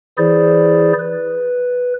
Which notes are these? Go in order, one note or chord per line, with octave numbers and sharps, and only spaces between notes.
E3 E4 G#4 C5 D5
B4